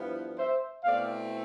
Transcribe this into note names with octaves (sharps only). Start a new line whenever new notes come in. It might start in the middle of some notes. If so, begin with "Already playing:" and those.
Already playing: G2 F3 B3 E4
C5 E5
B2 A3 C4 E4 D5 F5